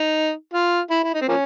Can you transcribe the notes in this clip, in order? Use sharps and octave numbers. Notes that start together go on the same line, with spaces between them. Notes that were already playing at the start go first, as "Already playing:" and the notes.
Already playing: D#4
F4
E4
E4
D#4
C4
F3 A#3 C#4